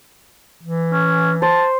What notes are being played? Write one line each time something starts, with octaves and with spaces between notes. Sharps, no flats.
E3
C#4
C5 A5